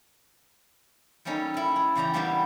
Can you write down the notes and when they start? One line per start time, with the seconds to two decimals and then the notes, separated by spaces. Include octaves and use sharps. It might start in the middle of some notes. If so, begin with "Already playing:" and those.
1.25 G3 A#3 C#4 D#4 A4
1.54 E4 A4
1.76 G#3
1.96 E2 C#3 D5 G5 A#5
2.14 G3 A#3 B3 D4 F#4 G4